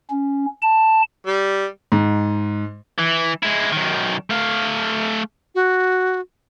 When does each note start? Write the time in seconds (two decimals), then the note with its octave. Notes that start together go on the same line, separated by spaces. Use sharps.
0.10 C#4
0.62 A5
1.26 G3
1.92 G#2
2.99 E3
3.43 G#3 E4
3.72 F#2 D#3
4.30 A3 F5
5.55 F#4